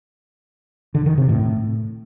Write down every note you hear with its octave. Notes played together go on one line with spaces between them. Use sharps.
D3
D#3
C3
A2